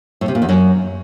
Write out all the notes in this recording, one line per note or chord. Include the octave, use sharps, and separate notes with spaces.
A2
C3
A#2
E2
F#2